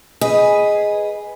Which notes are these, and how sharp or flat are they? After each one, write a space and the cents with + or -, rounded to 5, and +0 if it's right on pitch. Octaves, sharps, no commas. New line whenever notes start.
G#4 +0 B4 +0 D#5 +0